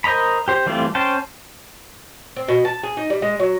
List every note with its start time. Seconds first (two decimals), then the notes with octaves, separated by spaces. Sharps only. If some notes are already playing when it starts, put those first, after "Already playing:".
0.04 A#4 C5 D#5 A#5 B5
0.48 G4 C5
0.66 E3 G3 A3 C4 F4
0.95 C#4 C5 G5 A5
2.36 C4
2.48 B2
2.65 A5
2.83 G#4
2.97 D#4
3.10 G3
3.22 G#3
3.39 F#3